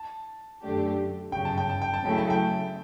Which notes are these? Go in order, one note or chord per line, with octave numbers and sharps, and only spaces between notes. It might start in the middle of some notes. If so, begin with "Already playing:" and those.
Already playing: A5
F#2 D3 A3 D4 G4
G1 F#2 C#3 G5
A5
G5
A5
G5
A5
C#3 F#3 A3 E4 G5
A5
G5